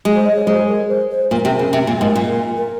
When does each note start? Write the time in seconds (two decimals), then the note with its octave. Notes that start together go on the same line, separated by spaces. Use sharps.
0.05 G#3
0.15 C5
0.25 D#5
0.36 C#5
0.47 G#3 C5
0.68 A#4
0.89 C5
1.10 C5
1.31 A#2 A#4
1.45 C3
1.59 C#3
1.73 C3
1.87 A#2
2.01 G#2
2.15 A#2
2.56 A#4